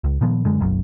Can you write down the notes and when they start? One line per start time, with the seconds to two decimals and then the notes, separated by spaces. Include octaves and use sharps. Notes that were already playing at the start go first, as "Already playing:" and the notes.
0.04 C#2
0.21 A#2 D#3 F3 B3
0.45 F#2 D3 G#3
0.60 F#1 B1 F#2